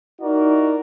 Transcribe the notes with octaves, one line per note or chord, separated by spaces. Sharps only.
D#4 E4 F#4 A#4 D5